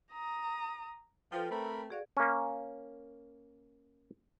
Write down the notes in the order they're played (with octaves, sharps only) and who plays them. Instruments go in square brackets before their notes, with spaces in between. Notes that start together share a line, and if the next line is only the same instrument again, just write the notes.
[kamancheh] A#5 D#6
[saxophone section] F3 [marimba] A4 B4 G5
[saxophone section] A3 C4 [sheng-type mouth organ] A#4 B5
[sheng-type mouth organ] F#4 [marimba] G#4 D5 F5
[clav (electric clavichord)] A#3 C#4